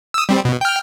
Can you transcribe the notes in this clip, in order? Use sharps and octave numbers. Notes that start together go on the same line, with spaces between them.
D#6 E6
G3 C4
B2
G5 F6